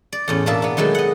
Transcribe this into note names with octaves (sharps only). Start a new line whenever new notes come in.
D5
E2 A2 C#4
B2 A#3 D4 E5 A5
B3 D4
D#3 F#3 G#3 A3
D#5 F#5